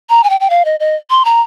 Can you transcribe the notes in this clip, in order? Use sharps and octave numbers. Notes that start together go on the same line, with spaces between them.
A#5
G#5
G5
G5
F5
D#5
D#5
C6
A#5